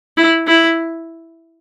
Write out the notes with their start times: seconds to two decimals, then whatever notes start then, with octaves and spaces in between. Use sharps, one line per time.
0.17 E4
0.47 E4